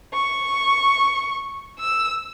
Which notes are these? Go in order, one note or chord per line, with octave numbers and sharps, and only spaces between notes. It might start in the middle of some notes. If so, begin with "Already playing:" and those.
C#6
E6